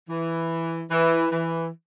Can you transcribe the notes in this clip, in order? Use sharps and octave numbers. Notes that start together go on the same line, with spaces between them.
E3
E3
E3